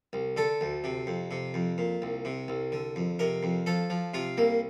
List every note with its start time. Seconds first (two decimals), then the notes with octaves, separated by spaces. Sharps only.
0.13 C2
0.37 D3 A4
0.61 D2
0.84 C3
1.07 F2
1.31 C3
1.54 F2
1.78 A#2
2.02 C2
2.25 C3
2.48 C2
2.72 D3
2.96 F2
3.19 C3 A#4
3.43 F2
3.66 F3 A4
3.90 F3
4.14 C3 F4
4.38 C2 A#3